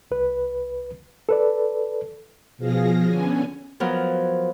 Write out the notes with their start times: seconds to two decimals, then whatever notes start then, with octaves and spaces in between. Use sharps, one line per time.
0.11 C2 B4
1.29 A4 B4 D5
2.58 B2 F3 G#4 F5 A#6
3.05 D3 B3 C#4 G#5
3.80 F3 F#3 B3 A#4